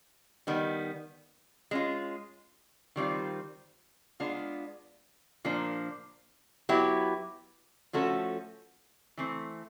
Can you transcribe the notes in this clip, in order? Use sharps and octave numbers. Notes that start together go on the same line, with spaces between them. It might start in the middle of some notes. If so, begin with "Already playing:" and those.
D#3 G3 B3
G#3 C#4 F4
D#3 G3 C4 F4
G#3 B3 D4 F4
A#2 F3 A#3 D4
F#3 B3 E4 G4
F3 A3 C#4 F#4 A4
E3 A3 C4